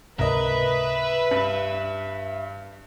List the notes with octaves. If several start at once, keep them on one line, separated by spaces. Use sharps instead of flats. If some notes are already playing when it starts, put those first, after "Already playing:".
C#2 G#2 C3 A#4 B4 D#5 E5
G2